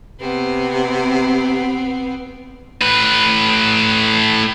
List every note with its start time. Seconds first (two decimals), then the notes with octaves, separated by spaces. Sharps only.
0.20 C3 B3 C4
2.82 A2 B4